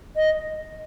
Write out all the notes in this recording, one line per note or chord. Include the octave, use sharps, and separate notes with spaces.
D#5